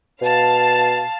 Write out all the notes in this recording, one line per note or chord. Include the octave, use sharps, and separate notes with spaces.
B2 F5 A5